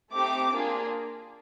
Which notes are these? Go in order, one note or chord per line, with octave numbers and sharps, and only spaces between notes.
A3 C4 D#4 G4 D6
A#3 D4 F4 G#4